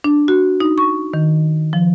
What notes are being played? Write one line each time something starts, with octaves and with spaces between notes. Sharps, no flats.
D4
F#4
D#4
C#6
D#3
F3